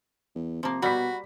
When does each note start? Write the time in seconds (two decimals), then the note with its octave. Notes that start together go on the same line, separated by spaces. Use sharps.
0.35 E2
0.63 C3 F3 A#3
0.82 B2 G3 F#4 D5 B5 B6